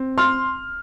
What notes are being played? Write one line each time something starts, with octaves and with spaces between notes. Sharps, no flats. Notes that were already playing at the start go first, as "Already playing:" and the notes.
Already playing: C4
C6 F6